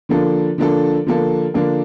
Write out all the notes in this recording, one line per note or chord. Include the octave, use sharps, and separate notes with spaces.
D3 F3 A#3 D4 A4
D3 F3 A#3 D4 A4
D3 F3 A#3 D4 A4
D3 F3 A#3 D4 A4